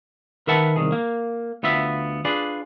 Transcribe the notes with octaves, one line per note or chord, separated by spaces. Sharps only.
D#3 A#4 B4 E5 F#5 A5
C2 F2 D#3 G#4
A#3
D2 B3 F4 E5
D4 F4 G#4 B4 D5